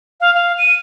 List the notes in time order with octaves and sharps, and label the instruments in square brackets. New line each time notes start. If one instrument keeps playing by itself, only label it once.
[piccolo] F5
F5
D#7